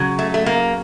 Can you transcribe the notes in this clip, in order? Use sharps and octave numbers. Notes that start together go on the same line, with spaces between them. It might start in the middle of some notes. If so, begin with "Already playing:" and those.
Already playing: C#3 F#3
A3
A3
A#3